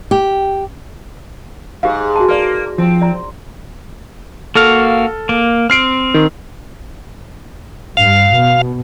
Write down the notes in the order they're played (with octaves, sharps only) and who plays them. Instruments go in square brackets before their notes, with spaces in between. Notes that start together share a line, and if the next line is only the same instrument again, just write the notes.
[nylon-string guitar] G4
[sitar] G#2 [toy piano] G4 F5
[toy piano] F#4 A5
[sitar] A#3 [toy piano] B4 D5
[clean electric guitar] F3 [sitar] C4
[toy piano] D5 A#5
[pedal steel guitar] A#3 F#4 F5 [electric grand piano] A4 F6
[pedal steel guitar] A#3
[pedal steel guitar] C4 [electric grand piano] F6 C7 D7
[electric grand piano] D#3
[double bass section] G2 [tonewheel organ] F5
[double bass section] B2